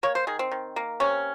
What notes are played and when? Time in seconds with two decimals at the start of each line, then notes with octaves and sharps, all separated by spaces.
0.03 A#3 C#5
0.15 C5
0.27 D#3 G#4
0.39 C4
0.52 D#3
0.76 A#3
1.00 C3 C#4